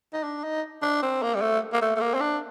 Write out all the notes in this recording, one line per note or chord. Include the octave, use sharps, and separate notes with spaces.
D#4
D4
D#4
D4
C4
A#3
G3
A3
A#3
A3
A3
A#3
C4
D4